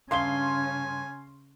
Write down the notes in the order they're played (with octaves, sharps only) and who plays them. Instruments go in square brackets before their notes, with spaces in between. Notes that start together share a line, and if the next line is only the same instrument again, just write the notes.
[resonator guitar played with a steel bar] G2 F5 [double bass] C#3 C#4 [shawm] G#5 [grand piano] C6 G7